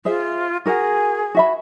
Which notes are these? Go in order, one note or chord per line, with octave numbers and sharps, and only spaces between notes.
F4 G#4 C5 E5
F#4 G#4 A#4 F#5
F#4 E5 B5